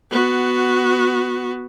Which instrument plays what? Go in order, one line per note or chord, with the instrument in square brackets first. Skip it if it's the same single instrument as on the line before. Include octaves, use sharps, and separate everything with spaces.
[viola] B3 F#4